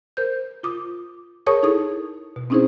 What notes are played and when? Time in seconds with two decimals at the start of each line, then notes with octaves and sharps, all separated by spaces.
0.17 A#4 C5 G6
0.63 F4 D6 D#6
1.46 G#4 A#4 C#5 A5 C#6 D#6
1.63 D#4 E4 G#4 A4 D#6
2.36 B2
2.50 C4 C#4 D#4 E4 G#4 C5